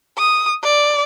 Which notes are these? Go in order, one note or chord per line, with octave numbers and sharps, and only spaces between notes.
D#6
D5